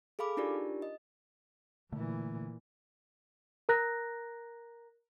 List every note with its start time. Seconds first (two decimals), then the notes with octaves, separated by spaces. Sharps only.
0.19 G#4 A4 F5 B5 D6
0.37 D4 D#4 F4 G4 A#4 D5
0.82 D#5
1.92 A#2 D3 E3 A3
3.69 A#4 A#5 F#6 A#6